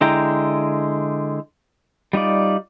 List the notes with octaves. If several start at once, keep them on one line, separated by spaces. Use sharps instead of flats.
D3 G#3 E4 G5 A#5
G3 D#4 F4 D5